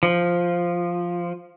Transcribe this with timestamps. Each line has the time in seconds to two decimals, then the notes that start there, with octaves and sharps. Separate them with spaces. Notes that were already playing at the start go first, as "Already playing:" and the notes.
0.03 F3